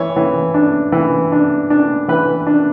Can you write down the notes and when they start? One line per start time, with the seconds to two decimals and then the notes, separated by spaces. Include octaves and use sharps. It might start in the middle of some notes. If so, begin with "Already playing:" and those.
Already playing: E3 C#5
0.16 E3
0.54 D4
0.92 E3
1.32 D4
1.70 D4
2.08 E3 B4
2.47 D4